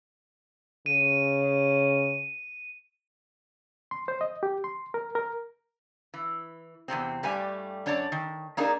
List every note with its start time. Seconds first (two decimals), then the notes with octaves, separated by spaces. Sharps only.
0.86 C#3 D#7
3.91 C6
4.08 C5
4.21 D#5
4.43 G4
4.64 C6
4.94 A#4
5.15 A#4
6.14 E3
6.88 E2 G#2 C3 C4
7.23 G2 G3 A3 G4 G#5
7.86 F#2 D4 C#5 D5 A5
8.12 D#3
8.57 A#3 D4 D#4 G#4 A#4